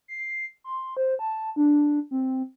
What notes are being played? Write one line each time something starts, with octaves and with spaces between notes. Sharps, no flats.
C7
C6
C5
A5
D4
C4